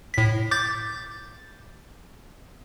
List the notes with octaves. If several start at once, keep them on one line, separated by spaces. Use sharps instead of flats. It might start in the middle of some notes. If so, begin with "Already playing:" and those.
A2 B6
D6 G6 A6